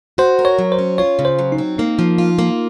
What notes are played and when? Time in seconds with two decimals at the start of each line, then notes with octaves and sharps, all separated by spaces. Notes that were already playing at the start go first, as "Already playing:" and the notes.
0.18 F#4 C5
0.39 A#4
0.45 C#5
0.59 F#3
0.72 C5
0.79 C#4
0.98 F4 C#5
1.19 C#3
1.25 C5
1.39 F#3
1.52 D#4
1.58 C4
1.78 A#3 D#4
1.99 F3
2.18 F4
2.39 A#3